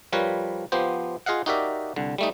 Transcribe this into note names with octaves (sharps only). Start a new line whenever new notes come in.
F3 G3 A#4 B4 C#5
F3 B3 G4 C5
F4 G#4 D#5 F5 F#5
D#4 F#4 G4 A#4 D5 E5
C2 D3
G3 A3 D#4